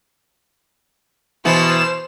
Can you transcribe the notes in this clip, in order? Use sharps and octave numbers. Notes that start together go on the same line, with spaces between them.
B2 E3 B3 C5 E7